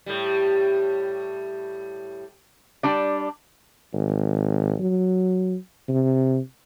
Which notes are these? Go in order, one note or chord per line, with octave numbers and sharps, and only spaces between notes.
A2 G3
G3 D4 D5
G#1
F#3
C3